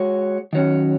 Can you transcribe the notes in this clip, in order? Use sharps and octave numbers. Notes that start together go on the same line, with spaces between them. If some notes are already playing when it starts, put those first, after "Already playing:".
Already playing: G#3 F#4 C#5
D#3 F#3 C#4